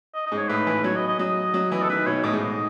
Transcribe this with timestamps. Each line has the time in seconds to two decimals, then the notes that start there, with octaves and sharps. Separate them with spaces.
0.14 D#5
0.26 D#5
0.32 G#2
0.37 C#5
0.49 A2 B4
0.67 E3
0.84 F#3 C#5
0.96 D#5
1.07 D#5
1.19 F#3 D#5
1.54 F#3
1.72 E3
1.83 A4
1.89 D#3 B4
2.06 B2 C#5
2.24 A2 D#5
2.33 G#2